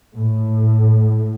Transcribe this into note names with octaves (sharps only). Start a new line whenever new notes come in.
A2